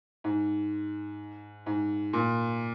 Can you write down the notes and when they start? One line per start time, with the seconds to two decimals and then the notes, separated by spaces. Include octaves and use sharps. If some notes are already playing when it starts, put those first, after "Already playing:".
0.24 G#2
1.66 G#2
2.13 A#2